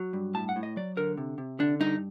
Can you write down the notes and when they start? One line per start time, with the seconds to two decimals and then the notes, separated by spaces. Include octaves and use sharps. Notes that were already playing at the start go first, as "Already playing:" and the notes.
Already playing: F#3
0.13 G2
0.34 A2 A5
0.49 F#5
0.56 A2
0.63 D#5
0.76 F#3 D5
0.97 D3 A#4
1.17 C3
1.38 C3
1.59 D3 D4
1.80 G2 D#4